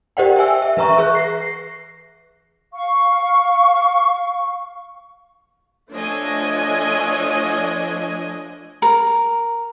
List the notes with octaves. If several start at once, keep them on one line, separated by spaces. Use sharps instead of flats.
G4 A#4 C5 D5 F#5 G5
E5 G5 G#5 E6
E5
E3 B4 E5 A#5 C#6
G#4 B4 C#6 F#6
A#6 C7
F5 C#6
F3 A3 D4 C#5 D#5 G#5
A#4